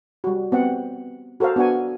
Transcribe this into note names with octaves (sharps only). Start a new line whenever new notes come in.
G3 F#4
B3 C4 F#5
F#4 A4 A#4 C5 F5
B3 D4 F#4 F#5 G#5